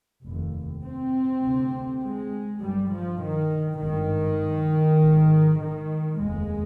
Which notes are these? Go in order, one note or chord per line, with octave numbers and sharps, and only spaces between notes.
F1 D#2
C4
D2 C3
G#3
G1 G2 G3
F3
D#3
G#1 G2 D#3
G#1 G#2
D#3
F1 D#2 G#3